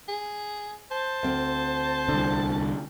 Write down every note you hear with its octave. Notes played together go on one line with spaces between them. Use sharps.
G#4
C5 A5
D2 C4
C2 D3